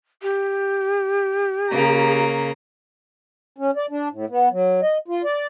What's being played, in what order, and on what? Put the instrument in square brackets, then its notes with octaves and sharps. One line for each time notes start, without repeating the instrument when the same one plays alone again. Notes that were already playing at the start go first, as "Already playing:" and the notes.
[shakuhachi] G4
[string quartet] C#3 A#3 A#5
[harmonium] C#4
D5
D4
A2
B3
F#3
D#5
F4
D5